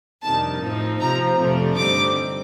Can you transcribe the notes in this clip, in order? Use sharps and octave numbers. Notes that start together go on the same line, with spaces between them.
F2 C3 D#3 G3 D4 A5
A2 F3 C4 D#4
C3 F3 C4 A#5
F2 C3 F3 A3 D4
G2 D3 G3 C4 D#4 D6